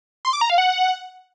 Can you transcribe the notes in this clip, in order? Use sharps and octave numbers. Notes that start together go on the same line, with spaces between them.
C6
D6
A#5
F5
F#5